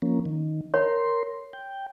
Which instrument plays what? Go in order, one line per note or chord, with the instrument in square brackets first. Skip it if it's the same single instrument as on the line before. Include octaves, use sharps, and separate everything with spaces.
[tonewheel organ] F3 A#3 C#4
D#3
[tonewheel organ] A#4 C6 [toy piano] C#5 B5
[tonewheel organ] G5